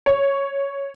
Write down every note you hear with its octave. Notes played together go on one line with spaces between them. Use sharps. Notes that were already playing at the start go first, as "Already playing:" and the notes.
C#5